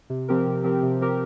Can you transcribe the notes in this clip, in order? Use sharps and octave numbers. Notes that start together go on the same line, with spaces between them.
C3
F3 C4 G4 A#4
C3
F3 C4 G4 A#4
C3
F3 C4 G4 A#4